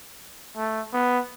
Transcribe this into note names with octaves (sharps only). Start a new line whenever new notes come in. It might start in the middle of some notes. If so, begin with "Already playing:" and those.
A3
B3